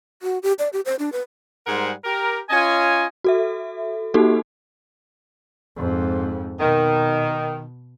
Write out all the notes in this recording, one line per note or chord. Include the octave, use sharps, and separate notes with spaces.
F#4
G4
D5
G4
C5
D4
B4
G#2 G3 G#4 A#4 C5 F#5
G4 A#4
C#4 F4 C#5 D#5 G#5
F#4 A4 E5
A#3 D#4 F#4 G4 A4
F2 G#2
B2 D#3